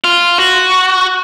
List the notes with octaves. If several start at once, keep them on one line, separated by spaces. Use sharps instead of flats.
F4
F#4